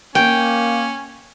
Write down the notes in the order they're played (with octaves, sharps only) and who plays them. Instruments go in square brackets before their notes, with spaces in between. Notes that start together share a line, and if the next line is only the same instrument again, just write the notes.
[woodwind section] A#3 [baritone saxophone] C#4 [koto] G5